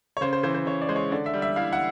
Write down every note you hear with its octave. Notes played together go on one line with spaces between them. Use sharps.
C#5
C#3 C5
C5
E3 C5
C5
C#3 C#5
D5
G#3 C5
C#5
D3 D5
E5
G3
E5
E4 F5
F#5